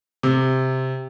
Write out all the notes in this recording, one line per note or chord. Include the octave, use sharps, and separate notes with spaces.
C3